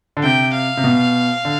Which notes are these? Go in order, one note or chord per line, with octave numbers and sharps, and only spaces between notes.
D3
C3 G5
F5
C3
B2
D3